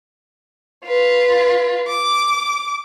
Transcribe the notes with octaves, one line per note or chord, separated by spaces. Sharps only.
F4 B4
D6